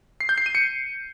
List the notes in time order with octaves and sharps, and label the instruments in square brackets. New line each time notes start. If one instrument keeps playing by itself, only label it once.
[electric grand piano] C7
G6
C7
D#7
C#7